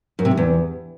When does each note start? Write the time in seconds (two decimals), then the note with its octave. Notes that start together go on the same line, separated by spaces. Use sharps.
0.19 F#2
0.25 C3
0.31 F#2
0.37 E2